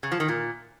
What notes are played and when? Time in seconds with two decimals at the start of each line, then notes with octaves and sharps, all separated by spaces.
0.03 C#3
0.12 F3
0.20 D#3
0.28 A#2